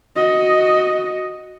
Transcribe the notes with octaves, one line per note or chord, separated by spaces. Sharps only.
F#4 D#5